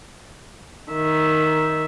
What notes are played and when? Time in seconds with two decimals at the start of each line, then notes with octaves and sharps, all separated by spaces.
0.93 D#3 E5